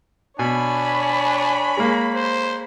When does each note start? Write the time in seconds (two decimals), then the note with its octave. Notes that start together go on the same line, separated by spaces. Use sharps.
0.39 B2 D4 C#5 G#5 B5
1.77 G#3 A#3
2.14 C5